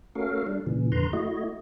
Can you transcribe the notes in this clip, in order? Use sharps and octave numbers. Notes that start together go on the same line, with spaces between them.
A3 C#4 F#4 A4 A#4 F5
G3 D4
A#2 C#3 E3
F2 D3 B4 A#5 C6
A3 E4 F#4 D#5